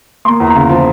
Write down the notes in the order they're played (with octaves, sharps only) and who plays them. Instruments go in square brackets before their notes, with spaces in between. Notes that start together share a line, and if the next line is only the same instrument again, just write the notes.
[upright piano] A#3 C6
E2
A#5
C#3
F3